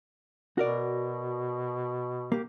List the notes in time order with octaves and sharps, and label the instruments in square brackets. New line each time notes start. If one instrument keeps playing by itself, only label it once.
[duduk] B2 [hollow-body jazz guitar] F#4 A#4 D5
[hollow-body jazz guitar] A#3 G4